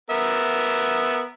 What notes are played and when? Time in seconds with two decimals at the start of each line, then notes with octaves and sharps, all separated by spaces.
0.10 B3 A#4 E5